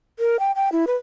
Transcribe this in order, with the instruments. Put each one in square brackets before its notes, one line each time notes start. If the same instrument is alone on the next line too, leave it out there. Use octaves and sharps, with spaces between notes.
[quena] A#4
G5
G5
E4
B4